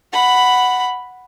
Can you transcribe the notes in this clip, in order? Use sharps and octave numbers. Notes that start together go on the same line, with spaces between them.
F#5 B5